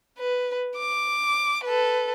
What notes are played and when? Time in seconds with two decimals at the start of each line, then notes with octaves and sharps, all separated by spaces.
0.19 B4
0.78 D6
1.64 A4 B4